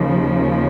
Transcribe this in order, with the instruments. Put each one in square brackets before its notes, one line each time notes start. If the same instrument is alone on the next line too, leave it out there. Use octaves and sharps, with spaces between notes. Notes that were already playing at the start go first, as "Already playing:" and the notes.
Already playing: [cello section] D#2 C#3 F3